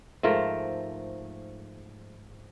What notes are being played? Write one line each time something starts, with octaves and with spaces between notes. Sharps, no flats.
G#2 F3 A3 A#4